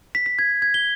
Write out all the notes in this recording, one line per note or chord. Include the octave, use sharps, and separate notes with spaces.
B6
B6
G#6
G#6
G7